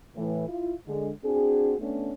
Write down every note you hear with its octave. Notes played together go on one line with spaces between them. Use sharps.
A2 E3
E4 F4
D3 G#3
C4 D4 F#4 G#4
A3 B3 C#4 D4